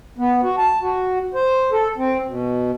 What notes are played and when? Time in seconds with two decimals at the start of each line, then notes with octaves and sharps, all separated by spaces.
0.18 B3
0.43 F#4
0.58 A5
0.82 F#4
1.34 C5
1.72 A4
1.98 C4
2.28 B2